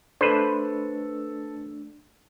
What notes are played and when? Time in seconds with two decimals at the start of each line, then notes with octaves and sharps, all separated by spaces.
0.21 A3 D4 A4 B4 C5